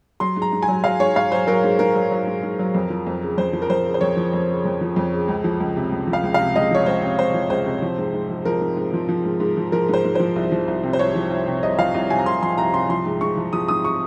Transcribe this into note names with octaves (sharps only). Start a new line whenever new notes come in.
F#3 C6
G#2
A#5
G#2
G#5
F#3
F#3 F5
G#2 C#5
G#2 F5
F#3 C5
F#3 A#4
G#2
G#2 A#4
F#3
F#3
G#2
G#2
F#3
F2
F3
F2
C#3
F2 C5
F3
A#4
F2 C5
C#3
C5
F2 C#5
F3
F2
C#3
F2
F3
F2
C#3
C#2
F3
C#2
C3
C#2
F3
F5
C#2
C3 F5
C#2 D#5
F3 C#5
C#2 C5
C3
C#2 C5
F3
C#2 C5
C3
F3
G#2
G#2
F3
F3 A#4
G#2
G#2
F3
F3
G#2
G#2
F3
F3 A#4
G#2 C5
G#2
F3 C5
C2
F3
C2
C3
C5
C2 C#5
F3
C2
C3
C2 D#5
F3 F5
C2
C3 G#5
A#5
C2 C6
F3 C6
C2 A#5
C3 C6
F3 C6
G#2
G#2 C#6
F3
F3 D#6
G#2 D#6
C#6